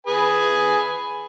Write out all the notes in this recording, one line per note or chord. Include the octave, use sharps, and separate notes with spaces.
G#4 B4 G#5